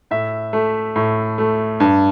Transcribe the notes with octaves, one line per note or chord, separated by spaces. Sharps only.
A2 E5
A3
A2
A3
G2